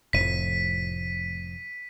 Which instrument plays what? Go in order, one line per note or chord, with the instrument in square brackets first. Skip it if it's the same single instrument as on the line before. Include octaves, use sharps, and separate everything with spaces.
[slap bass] F1 F2 A2 [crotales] B6 D#7